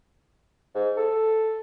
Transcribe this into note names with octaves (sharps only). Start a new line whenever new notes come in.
G#2
A4